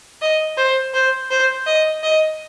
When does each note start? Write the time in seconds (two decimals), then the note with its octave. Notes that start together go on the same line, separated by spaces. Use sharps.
0.22 D#5
0.58 C5
0.94 C5
1.31 C5
1.67 D#5
2.03 D#5